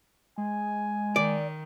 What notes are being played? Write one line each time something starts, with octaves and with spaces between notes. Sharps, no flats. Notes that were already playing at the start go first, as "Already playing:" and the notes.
G#3 G#5
D#3 D5